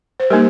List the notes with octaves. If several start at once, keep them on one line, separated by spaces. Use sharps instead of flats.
C5
G3 A#3 D#4 G4 A#4